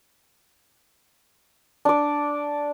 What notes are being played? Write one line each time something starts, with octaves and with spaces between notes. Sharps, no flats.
D4 D5